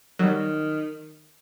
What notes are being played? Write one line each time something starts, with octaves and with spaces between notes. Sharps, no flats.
D#3 F#3 G3